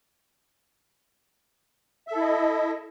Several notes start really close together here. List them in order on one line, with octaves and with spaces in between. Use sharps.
E5 A4 E4 D#5